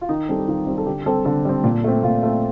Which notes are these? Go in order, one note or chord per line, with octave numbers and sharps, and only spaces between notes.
F4
D#3 D#4
G3 C4 A4
G4
D#3 F4
G3 C4
A4
D3 G4
G3 C4 A4
D3 A4
G3 C4
A#2
A3 C4
A#2 F4
A3 C4 F4